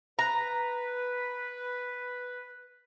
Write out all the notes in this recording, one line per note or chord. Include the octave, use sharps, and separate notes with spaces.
B4 A#5